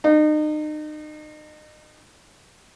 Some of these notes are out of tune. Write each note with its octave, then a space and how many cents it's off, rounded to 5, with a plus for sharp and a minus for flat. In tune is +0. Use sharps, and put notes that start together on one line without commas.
D#4 -35